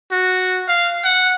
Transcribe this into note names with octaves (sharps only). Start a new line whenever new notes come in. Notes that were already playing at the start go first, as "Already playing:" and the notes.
F#4
F5
F#5